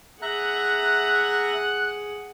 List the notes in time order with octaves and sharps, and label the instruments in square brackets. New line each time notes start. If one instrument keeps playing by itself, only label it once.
[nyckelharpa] G#4 F#5 [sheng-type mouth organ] E5 A#5 [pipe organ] F#6